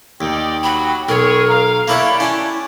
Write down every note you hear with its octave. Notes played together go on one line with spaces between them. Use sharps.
D#2 D#4 G4 D5 G5
F#3 B5
B1 G#4 A#4 C#5
F5 A#5
A3 A#3 D4 E4 G4 C#5 F5 B5
C#4 E4 G#5